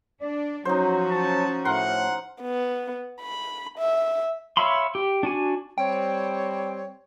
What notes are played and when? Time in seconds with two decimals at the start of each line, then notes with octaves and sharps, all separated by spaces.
0.22 D4 D5
0.65 F3 F#3 C#4 D#4 F#4 C5
1.10 A5
1.65 A2 A#4 F#5 C6
2.42 B3
3.22 B5
3.79 E5
4.57 C#5 E5 F5 B5 C6
4.95 G4
5.23 D4 F#4 G#5
5.78 G3 C4 C#5 G5